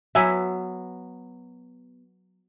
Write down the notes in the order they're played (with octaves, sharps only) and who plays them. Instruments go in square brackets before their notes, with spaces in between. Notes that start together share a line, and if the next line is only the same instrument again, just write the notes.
[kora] F#3 B3 [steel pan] E5 G#5